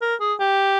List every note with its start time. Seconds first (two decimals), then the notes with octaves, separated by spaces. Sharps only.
0.02 A#4
0.21 G#4
0.40 G4